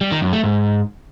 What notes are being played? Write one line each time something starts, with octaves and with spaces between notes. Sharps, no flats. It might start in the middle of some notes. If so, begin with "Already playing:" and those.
G3
D#3
F#2
A3
G#2